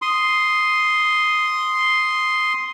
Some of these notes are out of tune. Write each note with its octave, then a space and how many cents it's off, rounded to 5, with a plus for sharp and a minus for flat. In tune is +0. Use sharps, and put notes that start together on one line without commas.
C6 +0 D#6 +0